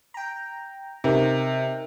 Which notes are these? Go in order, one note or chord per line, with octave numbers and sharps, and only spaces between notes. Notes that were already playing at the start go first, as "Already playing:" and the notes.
G5 A#5
C3 D#4 A#4